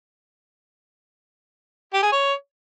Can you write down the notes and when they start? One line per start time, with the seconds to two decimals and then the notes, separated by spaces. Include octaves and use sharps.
1.93 G4
2.03 G#4
2.12 C#5